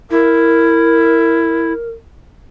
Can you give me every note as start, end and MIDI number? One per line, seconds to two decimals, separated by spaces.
0.11 1.73 64
0.11 1.90 70